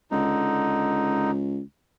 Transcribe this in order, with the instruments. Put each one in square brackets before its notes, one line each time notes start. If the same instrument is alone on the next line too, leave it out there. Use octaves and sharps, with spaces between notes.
[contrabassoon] C#2 [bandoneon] D3 D#4